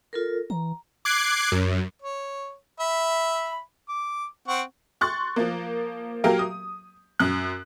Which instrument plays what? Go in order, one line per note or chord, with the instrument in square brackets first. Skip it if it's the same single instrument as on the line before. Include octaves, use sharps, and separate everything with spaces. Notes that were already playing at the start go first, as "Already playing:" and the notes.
[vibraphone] F4 A4 A#4
[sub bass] E3 [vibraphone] A#5
[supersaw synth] D6 F#6 G#6 C7
F#2
[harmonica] C#5
E5 B5
D6
C4 F#5 C#6
[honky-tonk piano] C6 C#6 F#6 A6
F3 A#3
F#3 A#3 G4 A#4 F5
D#6
F#2 F#6